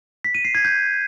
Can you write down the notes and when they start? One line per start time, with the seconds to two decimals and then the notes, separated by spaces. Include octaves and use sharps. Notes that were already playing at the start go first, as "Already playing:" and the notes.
0.24 B6
0.35 D#7
0.45 C7
0.55 G#6
0.65 G6